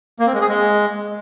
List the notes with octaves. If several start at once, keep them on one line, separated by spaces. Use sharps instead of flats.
A#3
C4
G#3
G#4
G#3